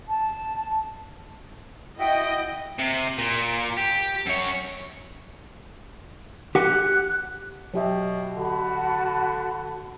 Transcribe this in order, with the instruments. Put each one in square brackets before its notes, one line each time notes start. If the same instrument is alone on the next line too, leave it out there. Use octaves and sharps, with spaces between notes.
[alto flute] A5
[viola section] E4 D#5 [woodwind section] F#4 E5 G5
[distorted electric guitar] C3
A#2
G4
F#2 C#5
[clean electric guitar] G4 F#5 [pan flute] F#6
[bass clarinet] B2 [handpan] F#3 G4 E5
[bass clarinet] D3 [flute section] F#4 A5 B5